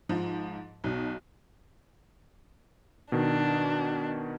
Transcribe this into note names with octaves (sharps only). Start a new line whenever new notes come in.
G#2 F3
B1 B2
B2 D#3 D4